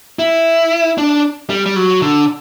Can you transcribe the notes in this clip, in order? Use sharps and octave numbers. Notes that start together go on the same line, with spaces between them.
E4
D4
G3
G3
F#3
D3